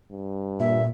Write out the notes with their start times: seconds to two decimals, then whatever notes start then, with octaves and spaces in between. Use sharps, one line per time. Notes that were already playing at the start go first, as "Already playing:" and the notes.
0.11 G2
0.60 A#2 E5